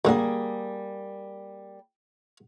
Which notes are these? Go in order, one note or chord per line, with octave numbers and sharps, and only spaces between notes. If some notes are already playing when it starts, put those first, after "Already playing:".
D2 D3 G3 A#3 G#4